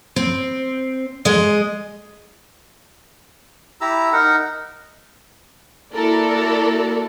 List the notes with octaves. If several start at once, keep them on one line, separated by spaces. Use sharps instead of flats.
C4
G#3 D#5
E4 G4 A#5 E6
D#4 A#4 F#5
A#3 E4 F#4 A4 A#4 D5